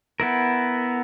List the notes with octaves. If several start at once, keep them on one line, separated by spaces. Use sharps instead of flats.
B3 E4 A#4